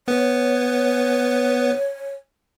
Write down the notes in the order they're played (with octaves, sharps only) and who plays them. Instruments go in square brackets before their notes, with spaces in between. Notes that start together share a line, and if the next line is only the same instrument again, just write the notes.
[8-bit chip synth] B3 B4 [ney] C#5